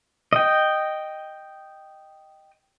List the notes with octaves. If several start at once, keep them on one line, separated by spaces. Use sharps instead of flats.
D#5 G5